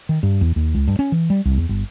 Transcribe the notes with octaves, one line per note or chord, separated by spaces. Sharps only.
D#3
G2
E2
D#2
C#2
G2
C#4
E3
G3
C2
E2
G1